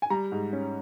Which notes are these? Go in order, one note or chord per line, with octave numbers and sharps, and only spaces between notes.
G#5
G3 A#5
G#2
C#4